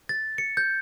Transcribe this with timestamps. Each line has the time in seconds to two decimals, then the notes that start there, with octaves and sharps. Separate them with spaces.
0.09 A6
0.38 C#7
0.57 G6